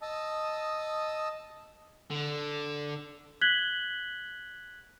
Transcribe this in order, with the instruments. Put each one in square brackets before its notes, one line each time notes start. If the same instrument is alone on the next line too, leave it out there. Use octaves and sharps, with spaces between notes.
[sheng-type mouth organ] D#5 A5 D#6 E6
[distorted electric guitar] D3
[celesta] F#6 G#6 B6 F#7 G7